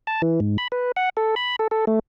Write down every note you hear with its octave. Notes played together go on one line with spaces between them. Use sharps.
A5
E3
G#2
B5
B4
F#5
A4
B5
A4
A4
A3